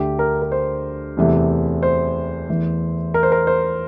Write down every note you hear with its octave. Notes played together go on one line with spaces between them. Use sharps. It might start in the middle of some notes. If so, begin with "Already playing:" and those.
Already playing: D2 D3 A3 G4
A#4
A#4
C5
E2 C3 E3 A3
C5
E2 E3 A3
A#4
C5
A#4
C5